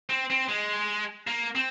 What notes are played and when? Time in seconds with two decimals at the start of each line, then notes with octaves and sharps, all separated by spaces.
0.10 C4
0.30 C4
0.49 G#3
1.27 A#3
1.55 C4